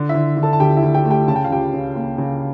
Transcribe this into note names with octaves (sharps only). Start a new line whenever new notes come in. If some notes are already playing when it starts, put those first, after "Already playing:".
Already playing: D3
E4 E5
D3
D3
A4 A5
A5
D2 G4 G5
E4 E5
D2
G4 G5
A3
G4 G5
C#3 A5
G5
F5
C#2 G4 G5
C#3
A#3
C#3